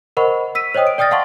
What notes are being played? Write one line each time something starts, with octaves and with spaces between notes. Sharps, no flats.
A#4 C5 D#5 F#5 B5 C#6
E6 B6 D#7
C5 C#5 D#5 G5 D#6
D7
D5 G5 D#6 F6 A6 A#6
F5 F#5 A5 C6 C#6 A6